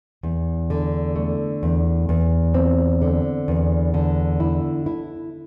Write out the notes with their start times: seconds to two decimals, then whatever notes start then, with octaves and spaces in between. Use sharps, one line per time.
0.23 E2
0.70 D3
1.16 A3
1.63 E2
2.09 E2
2.54 C4
3.02 D3
3.48 E2
3.94 D3
4.40 E4
4.86 E4